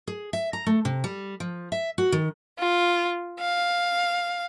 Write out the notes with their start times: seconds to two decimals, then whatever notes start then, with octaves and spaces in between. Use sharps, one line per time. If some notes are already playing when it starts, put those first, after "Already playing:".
0.07 G#4
0.33 E5
0.53 A#5
0.66 A3
0.85 C3
1.04 G3
1.40 F3
1.72 E5
1.98 F#4
2.12 D#3
2.59 F4
3.39 F5